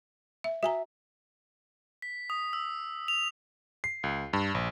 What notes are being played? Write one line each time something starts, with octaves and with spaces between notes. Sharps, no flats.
E5
F#4 E5 G#5 A#5
B6
D#6
E6
F7
C7
C#2
G2
A#1